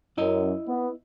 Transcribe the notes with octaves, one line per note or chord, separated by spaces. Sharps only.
F#2 E4 D#5
B3